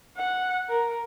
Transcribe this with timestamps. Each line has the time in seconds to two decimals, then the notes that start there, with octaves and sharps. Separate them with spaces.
0.17 F#5
0.69 A#4